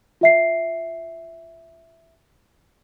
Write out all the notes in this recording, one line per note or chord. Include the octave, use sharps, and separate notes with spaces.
F4 E5 C7